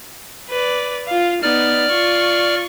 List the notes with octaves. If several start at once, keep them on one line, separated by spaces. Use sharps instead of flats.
B4 D5
F4 F5
B3 D#4 D5 F6
F4 C#6